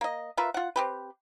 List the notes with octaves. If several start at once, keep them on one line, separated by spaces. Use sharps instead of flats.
A#3 D#5
F4 A#4 B4 E5
F4 F#5
C4 G4 B4